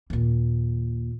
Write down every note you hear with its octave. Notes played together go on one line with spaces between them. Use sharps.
D#2 A#2